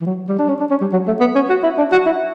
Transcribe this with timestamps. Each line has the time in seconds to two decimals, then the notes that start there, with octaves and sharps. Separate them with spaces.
0.01 E3
0.06 F#3
0.29 G3
0.39 D4
0.49 C#4
0.60 D4
0.70 C#4
0.81 G3
0.93 F#3
1.07 A3
1.20 B3
1.35 C#4
1.50 F#4
1.63 E4
1.78 D4
1.92 F#4
2.06 E4